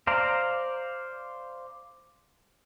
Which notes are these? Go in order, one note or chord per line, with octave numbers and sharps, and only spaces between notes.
C5 D5 F5 A#5